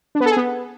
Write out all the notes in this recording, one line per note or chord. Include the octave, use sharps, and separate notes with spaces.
D4
B3
A4
G#4
B3